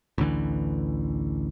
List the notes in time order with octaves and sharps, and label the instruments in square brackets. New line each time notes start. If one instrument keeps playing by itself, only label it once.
[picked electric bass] A1 D2 D3 E3